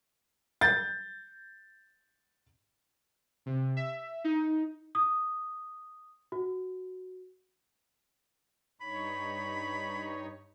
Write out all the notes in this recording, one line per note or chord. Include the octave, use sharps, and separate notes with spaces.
G6 A6
C3
E5
D#4
D#6
F#4
G2 D#4 C#5 B5